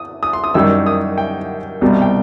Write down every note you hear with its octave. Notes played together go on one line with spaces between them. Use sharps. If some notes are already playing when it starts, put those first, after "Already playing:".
Already playing: D#6
D#6
C6
D#6
F#2 D#3 G3 E6
D#6
G5
C2 B2 G3
G5